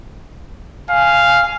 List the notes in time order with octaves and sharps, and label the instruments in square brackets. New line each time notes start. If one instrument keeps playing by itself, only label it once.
[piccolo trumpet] F5 [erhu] G#5